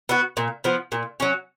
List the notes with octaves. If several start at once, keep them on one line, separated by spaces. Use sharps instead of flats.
B3 F#4
A#2
F3 B3
A#2
F#3 C#4